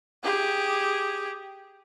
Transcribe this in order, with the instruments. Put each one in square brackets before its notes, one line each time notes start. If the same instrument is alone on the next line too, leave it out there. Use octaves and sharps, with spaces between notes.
[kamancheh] G4 G#4